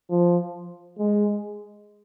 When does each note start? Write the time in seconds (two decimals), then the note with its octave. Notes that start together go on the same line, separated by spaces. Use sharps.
0.10 F3
0.98 G#3